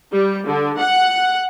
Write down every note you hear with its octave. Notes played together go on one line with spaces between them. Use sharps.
G3
D3
F#5